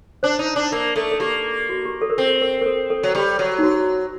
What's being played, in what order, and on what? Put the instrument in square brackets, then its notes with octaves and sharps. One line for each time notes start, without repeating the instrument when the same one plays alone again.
[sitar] D4 [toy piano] C5
[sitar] D#4
D4
[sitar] A#3 [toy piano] A#4
[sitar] A3 [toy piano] A4
[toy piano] A4
[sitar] A#3 [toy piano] G4
[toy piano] F#4
G4
A4
A#4
[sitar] C4 [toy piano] A4
[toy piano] A#4
A#4
A4
A4
[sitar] F#3
[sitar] G3 [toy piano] G4
[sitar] F#3
[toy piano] D#4
F#4